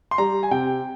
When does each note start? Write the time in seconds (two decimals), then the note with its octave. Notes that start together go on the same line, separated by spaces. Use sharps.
0.11 C6
0.18 G3 A#5
0.43 G#5
0.51 C3 G5